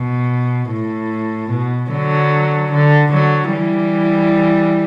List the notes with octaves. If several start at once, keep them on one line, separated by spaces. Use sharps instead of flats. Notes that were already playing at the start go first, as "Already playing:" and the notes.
Already playing: B2
A2
B2
D3 F#3
D3
D3 F#3
E3 G3